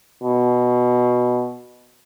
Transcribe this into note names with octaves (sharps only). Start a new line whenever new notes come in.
B2